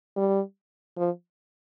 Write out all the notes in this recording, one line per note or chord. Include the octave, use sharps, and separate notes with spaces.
G3
F3